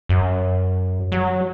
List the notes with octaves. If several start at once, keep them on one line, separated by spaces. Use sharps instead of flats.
F#2
F#3